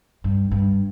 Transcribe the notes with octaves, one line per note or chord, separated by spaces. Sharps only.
G2
G2